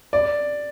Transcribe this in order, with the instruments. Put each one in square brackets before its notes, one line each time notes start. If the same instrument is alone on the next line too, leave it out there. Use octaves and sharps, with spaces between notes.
[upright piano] D5